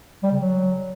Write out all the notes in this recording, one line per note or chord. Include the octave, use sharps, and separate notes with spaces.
G3
C#3
F#3